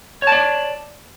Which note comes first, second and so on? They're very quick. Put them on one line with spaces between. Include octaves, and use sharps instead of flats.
C#5 A5 D5